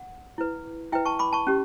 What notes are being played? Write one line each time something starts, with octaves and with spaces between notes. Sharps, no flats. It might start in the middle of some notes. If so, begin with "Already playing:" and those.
Already playing: F#5
E4 B4
E4 B4 E5 G5
A5 C#6
B5 D6
A5 C#6
C#4 G4